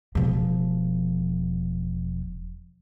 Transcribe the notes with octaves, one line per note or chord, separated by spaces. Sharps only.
E1 F3